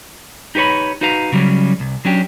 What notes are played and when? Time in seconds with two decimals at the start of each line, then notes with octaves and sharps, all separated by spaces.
0.55 D#4 G4 B4 C#5 B5
1.01 D#4 F#4 B4 F5 A#5
1.32 C#3 F#3 G3 C#4
1.80 C2
2.05 F#3 C#4 D4 G4